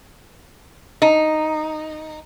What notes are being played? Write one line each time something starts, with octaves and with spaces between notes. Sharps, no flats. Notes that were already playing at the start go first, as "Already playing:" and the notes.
D#4